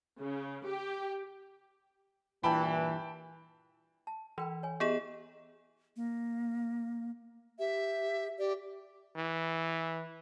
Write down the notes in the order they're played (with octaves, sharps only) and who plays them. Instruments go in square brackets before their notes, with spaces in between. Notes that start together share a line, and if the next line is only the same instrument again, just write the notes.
[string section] C#3
G4
[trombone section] G2 A#2 E3 [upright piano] G5 A5 B5
[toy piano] A5
[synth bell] E3 [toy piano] A#4 G5 B5
[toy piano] C#5 G#5
[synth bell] B3 G#4 E7 [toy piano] E4 G4 D#5
[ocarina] A#3
[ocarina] G4 [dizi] E5
[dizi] G4 [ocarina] D5
[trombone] E3